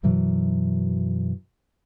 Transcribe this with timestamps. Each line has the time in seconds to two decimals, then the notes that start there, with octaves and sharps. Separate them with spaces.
0.03 F#2 B2 E3 F#3